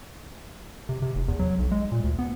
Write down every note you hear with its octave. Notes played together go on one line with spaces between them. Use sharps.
C3
C3
F1
E2
F#3
B1
G#3
A#2
D2
B3